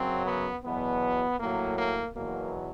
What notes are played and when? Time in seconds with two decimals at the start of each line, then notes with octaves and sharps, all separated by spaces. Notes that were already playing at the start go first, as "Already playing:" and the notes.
Already playing: F#2 C#3 F#3 C4
0.26 B3
0.64 E2 B2 F#3 B3
1.40 A2 F#3 A#3
1.79 A#3
2.16 E2 B2 F#3 A#3